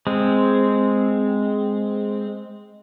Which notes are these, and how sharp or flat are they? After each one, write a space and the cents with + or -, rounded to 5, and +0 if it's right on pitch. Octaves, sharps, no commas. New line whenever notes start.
G#3 +0 C4 -5